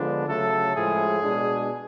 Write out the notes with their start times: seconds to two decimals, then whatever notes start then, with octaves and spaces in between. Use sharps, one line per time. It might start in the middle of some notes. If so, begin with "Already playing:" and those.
Already playing: D3 F3 G#3 B3 D4
0.28 C#3 F#3 A3 A4
0.75 A2 F3 G#3 G#4
1.23 B2 G#3 D4